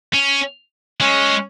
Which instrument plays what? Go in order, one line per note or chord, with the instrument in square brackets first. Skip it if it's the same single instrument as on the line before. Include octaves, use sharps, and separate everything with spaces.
[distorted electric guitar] C#4
[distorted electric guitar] G#3 [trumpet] C#4